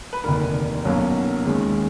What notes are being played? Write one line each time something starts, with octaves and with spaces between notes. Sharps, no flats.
B4
F1 D#2 D3 A#4
B1 B2 F#3 A#3 C#4
D#2 D#3 G#3 C#4